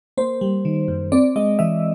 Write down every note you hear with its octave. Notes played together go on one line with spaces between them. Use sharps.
A#3 C5
G3
D#3
F#2
C4 D5
G#3 D#5
E3 E5